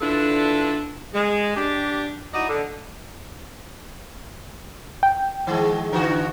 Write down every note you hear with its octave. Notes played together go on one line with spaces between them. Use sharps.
D3 D4 E4 F4 A4 B4
G#3
D4 G4
D#4 E4 F#4 D5 D#5
D3
G5
D#3 G#3
D3 E3 F#4